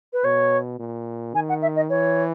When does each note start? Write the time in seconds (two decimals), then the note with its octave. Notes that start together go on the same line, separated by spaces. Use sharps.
0.13 B4
0.24 B2 C#5
0.79 A#2
1.34 D#3 G#5
1.49 F#5
1.62 E5
1.76 D#5
1.90 E3 C#5